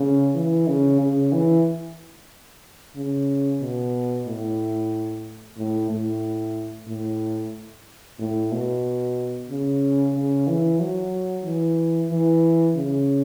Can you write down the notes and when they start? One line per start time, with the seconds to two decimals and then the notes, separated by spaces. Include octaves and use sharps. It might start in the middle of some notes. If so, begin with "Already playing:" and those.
Already playing: C#3
0.35 E3
0.67 C#3
1.00 C#3
1.33 E3
2.96 C#3
3.62 B2
4.27 A2
5.57 A2
5.90 A2
6.88 A2
8.19 A2
8.52 B2
9.49 C#3
10.15 C#3
10.47 E3
10.80 F#3
11.45 E3
12.11 E3
12.76 C#3